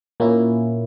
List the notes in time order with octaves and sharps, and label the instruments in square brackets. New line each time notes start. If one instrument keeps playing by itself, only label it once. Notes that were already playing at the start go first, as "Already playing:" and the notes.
[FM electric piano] A#2 A#3 C#4 E4